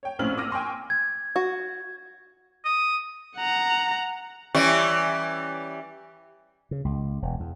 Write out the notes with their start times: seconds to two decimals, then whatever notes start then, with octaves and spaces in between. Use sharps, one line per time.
0.03 C#5 G5
0.19 A#1 A2 C4 C#4 F6 F#7
0.38 D6 E6 F6 A#6 D#7
0.51 G5 G#5 C6 C#6
0.90 G#6
1.36 F#4
2.65 D#6
3.37 F#5 A#5
4.55 E3 G3 C#4
6.71 C#3
6.85 C#2
7.22 E1
7.40 E2